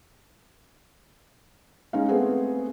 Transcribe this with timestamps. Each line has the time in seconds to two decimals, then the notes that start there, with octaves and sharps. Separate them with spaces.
1.93 G#3 C#4 D#4 F5
2.08 A3 B3 C4 G#4 B4 F#5